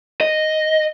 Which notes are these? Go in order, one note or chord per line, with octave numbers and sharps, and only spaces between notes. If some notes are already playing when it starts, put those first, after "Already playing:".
D#5